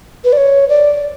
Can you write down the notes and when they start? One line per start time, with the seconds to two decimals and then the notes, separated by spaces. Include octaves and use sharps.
0.24 B4
0.33 D5
0.37 C#5
0.69 D5